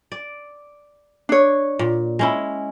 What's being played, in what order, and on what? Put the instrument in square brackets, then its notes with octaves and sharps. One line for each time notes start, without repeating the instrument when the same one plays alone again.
[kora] D5
[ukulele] D4 C#5
[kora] A#2
G#3 C#4 E4